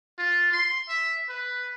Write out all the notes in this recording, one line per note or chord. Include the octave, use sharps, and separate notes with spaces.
F4
C6
E5
B4